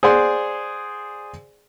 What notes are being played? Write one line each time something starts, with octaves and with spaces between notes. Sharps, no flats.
G#4 C5 D5 F#5 C6